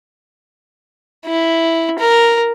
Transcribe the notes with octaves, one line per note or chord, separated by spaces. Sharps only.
E4
A#4